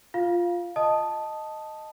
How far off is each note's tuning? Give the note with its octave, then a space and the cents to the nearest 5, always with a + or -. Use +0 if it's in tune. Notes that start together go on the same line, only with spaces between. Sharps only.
F4 +0 F5 +0
D#5 +0 A5 +0 D#6 -5